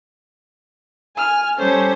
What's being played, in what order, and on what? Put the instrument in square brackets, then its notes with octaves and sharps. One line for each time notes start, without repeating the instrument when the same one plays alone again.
[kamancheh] G#5 F6
[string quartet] G3 C#4 [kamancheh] A4 C5